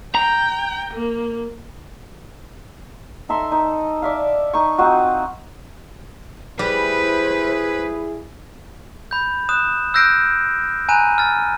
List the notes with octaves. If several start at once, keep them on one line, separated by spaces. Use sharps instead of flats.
G5 A#5
A#3
D#4 A4 E5 C6
D#4
D5 E5 F5
D#4 C#6
C4 D#4 F4 F#4
G3 E4 G#4 B4 C5
B5 G6
D#6 F#6 E7
E6 F#6 G6 A#6 C7 D7
G#5 A#5 B5 F#6 D#7
F6 A6